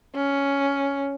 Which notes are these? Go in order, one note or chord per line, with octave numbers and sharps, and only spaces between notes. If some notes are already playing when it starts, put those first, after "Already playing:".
C#4